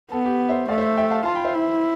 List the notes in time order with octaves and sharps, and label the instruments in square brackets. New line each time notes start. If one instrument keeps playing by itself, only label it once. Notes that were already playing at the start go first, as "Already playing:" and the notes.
[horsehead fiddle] B3 [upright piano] A4
[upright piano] G4
C5 E5
[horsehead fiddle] A3 [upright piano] D5 F5
[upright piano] C5 E5
E5 G5
F5 A5
[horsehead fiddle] F4 [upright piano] A5 C6
[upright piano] G5 B5
C5 E5
[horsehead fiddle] E4